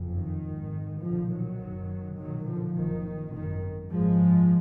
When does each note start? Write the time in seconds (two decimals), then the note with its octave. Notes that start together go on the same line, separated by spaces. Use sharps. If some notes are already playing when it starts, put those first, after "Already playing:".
Already playing: F#1 F2
0.16 D#3
0.44 G#1 G#2
1.01 B1 A#2 D3 F3
1.30 D#3 F#3
1.60 F#1 F#2
2.17 B1 A#2 D#3 F#3
2.46 D3 F3
2.75 F#1 F#2 D#3
3.33 G#1 F#2 D#3
3.91 G#1 F#2 F3 G#3